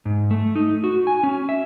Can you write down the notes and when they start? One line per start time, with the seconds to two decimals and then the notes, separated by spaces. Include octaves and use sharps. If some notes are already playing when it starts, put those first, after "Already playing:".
0.05 G#2
0.31 A3
0.55 D#4
0.84 F#4
1.07 G#5
1.23 C#4
1.49 E5